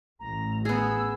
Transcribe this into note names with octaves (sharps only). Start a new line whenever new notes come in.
A1 A#5
B3 G#4 E6